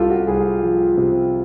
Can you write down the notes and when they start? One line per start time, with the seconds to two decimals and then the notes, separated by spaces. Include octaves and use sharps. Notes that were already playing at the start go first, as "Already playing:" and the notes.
Already playing: C2 C3 F4 G4 A4
0.10 F#4
0.27 C2 G#4
0.63 F3
0.97 C3